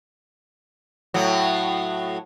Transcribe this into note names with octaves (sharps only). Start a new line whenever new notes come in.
A2 F#3